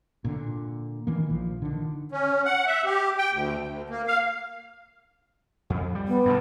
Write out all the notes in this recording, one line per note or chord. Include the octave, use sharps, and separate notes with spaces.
A#2 D3
D#3 E3 A#3
A#1 F3
D3 D#3
C#4
F#5
E5
G4
G5
D2
D2
A#3
F5
F2
G3
B3
G2 B2 D3